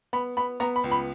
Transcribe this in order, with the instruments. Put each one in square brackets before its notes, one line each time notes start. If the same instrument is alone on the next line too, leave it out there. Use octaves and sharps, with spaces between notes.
[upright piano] B3 B5
B3 B5
B3 A#5
B5
C#2
B5